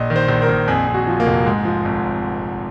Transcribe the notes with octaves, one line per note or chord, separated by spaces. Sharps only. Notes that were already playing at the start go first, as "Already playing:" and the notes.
Already playing: A#1 D#5
D#3
C5
A#1
A#4
A#1
F2 G#4
F2
F#4
F3
A#3
F1
G#2 G#3
F3
G#1